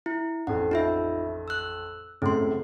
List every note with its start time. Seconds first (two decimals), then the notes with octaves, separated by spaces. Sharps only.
0.06 E4
0.47 A1 F2 F#5
0.71 D#4 F4 E5
1.48 E6 F#6
2.22 C#2 F#2 A2 C4 C6